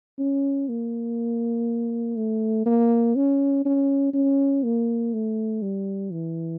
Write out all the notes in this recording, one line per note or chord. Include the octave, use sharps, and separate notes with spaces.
C#4
A#3
A3
A#3
C#4
C#4
C#4
A#3
A3
G3
E3